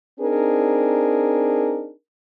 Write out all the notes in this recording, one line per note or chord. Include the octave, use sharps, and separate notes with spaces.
C4 D4 D#4 G#4 A#4